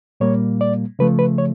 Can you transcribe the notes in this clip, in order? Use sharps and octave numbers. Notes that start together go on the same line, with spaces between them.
A#2 G3 A#3 C#5
D5
C#3 F3 A3 B4
B4
C#5